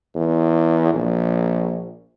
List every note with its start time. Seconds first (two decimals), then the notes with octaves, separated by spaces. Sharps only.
0.15 E2
0.94 A#1